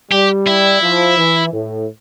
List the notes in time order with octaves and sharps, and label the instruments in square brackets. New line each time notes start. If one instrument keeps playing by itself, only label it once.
[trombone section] G3 [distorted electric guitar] G4
[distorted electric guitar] E4
[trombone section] F3
E3
A2